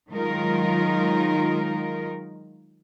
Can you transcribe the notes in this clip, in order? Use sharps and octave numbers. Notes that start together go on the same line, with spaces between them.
D#3 F#3 G#3 D#4 F4 A#4